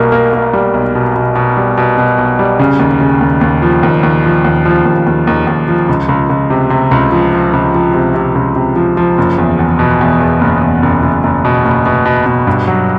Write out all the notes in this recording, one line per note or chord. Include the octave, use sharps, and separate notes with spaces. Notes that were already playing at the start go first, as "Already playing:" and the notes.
Already playing: B1 B2 G3 A#3
A#3
A#3
G3
B1
B2
B2
B2
G3
B2
B2
B1
G3
C#3
D#2
C#3
D#2
D#2
F3
D#2
D#2
F3
D#2
F3
D#2
D#2
D#2
D#2
F3
C#2
C#2
C#2
C3
C3
C#2
F3
F3
C#2
F3
C3
C3
C#2
C3
F3
F3
F#1
E2
E2
B2
E2
E2
F#1
E2
F#1
F#1
F#1
B2
F#1
B2
B2
B2
G2
F#3